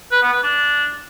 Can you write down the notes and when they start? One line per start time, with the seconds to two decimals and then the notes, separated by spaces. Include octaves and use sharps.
0.12 B4
0.22 B3
0.33 B4
0.43 D4